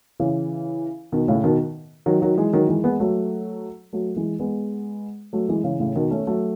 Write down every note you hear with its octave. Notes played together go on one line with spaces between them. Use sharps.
C#3 E3
B2 D#3
A2 C#3
B2 D#3
D#3 F#3
D#3 F#3
E3 G#3
D#3 F#3
E3 G#3
G#3 B3
F#3 A3
F#3 A3
E3 G#3
G#3 B3
F#3 A3
E3 G#3
C#3 E3
A2 C#3
B2 D#3
A3 C#4
F#3 A3